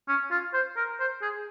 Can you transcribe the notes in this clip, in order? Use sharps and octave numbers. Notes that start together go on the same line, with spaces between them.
C#4
F4
C5
A#4
C5
G#4